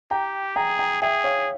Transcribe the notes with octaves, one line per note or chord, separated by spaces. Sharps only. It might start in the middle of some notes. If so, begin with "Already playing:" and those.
G4 G5 A#5
G#4 G5 A#5
G5 A#5
G#4 E5 G5
C#5 F5